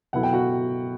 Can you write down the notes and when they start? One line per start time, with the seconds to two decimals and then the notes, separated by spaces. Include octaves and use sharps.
0.13 B2 F#3 B3 E4 A4 F#5
0.23 G5
0.33 F#4 F#5